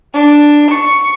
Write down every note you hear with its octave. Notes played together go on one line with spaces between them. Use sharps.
D4
C#6